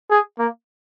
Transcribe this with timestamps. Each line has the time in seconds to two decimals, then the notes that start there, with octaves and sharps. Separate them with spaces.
0.11 G#4
0.39 A#3